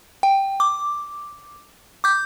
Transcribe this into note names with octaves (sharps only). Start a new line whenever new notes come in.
G5
D6
D6 G6